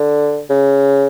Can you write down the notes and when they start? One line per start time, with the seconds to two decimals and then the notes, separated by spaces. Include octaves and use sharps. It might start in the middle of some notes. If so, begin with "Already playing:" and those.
Already playing: D3
0.50 C#3